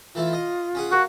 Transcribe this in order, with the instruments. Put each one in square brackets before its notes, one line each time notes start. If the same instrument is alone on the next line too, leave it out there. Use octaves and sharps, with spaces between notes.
[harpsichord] E3 A3 E4 [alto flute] F4
[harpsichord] D#5
C#4 G#4 F#5
[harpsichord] A#3 [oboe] F#4